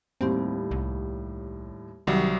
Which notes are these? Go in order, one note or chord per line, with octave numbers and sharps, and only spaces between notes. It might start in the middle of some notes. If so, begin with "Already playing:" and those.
D#2 A2 G3 C4
C2
C2 D#3 F#3 G3